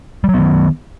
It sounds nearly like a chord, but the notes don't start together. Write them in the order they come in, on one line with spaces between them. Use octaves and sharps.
G3 F#3 B3 D#3